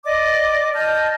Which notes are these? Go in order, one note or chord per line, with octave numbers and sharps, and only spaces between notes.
D5 D#5 D6
D#5 A5 F6 G6